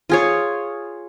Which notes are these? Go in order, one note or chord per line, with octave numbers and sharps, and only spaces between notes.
F4 G#4 C#5